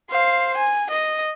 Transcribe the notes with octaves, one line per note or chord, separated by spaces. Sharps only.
C5 F5
G#5
D#5